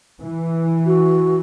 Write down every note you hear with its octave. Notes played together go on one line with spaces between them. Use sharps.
E3
F#4